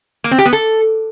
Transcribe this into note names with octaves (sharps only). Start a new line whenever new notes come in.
A#3
C4
G4
B3
A4